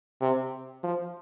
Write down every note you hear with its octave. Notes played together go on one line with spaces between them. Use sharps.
C3
F3